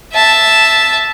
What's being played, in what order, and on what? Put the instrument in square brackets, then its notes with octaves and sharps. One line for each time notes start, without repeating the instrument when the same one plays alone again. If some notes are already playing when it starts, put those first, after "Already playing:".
[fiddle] E5 A5